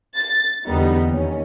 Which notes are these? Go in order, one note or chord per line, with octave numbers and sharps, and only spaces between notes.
A6
E2 D3 G3 B3 D#4
D#2 C#4